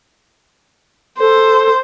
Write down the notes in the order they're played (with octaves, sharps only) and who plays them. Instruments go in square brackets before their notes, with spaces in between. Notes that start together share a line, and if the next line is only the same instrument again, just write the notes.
[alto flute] A4 [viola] C5